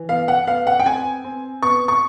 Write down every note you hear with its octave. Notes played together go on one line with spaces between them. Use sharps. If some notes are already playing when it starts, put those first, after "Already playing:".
Already playing: E3
B3 F5
F#5
B3 F5
F#5
G5
C4 G#5
C4
B3 C#6
C#6